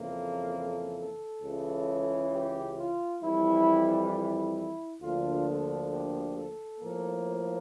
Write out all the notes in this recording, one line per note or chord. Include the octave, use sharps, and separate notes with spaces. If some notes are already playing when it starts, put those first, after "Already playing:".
Already playing: F2 C#3 E3 A#3
A4
A4
A4
C#2 C#3 E3
G4
F4
F2 E3 G3 E4
E4
D2 D3 F3 A#3 F4
A4
G4
A4
A2 F3 A#3
A4